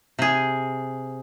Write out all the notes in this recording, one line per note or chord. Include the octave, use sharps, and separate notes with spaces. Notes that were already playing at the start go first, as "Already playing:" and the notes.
C3 G#4